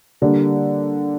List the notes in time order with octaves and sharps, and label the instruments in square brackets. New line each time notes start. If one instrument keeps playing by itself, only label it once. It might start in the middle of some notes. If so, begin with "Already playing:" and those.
[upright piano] D3 G3 A#3 D4